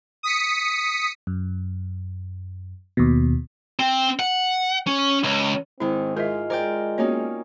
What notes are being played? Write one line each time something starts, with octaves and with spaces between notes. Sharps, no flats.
D#6 B6 C#7
F#2
D#2 B2
C4
F#5
C#4
C#2
G#2 D#3 C4 E4
G#3 F4 A#4 C5 E5
A#4 C5 D5 G5
A#3 B3 C#4 D#4 F#4 C#5